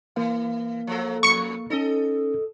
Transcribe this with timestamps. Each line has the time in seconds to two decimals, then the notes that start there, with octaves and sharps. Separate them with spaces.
0.16 E3 A#3 F5
0.87 F3 F#3 A4
1.23 F2 C#6 C#7
1.70 C#4 D#4 A4 D#5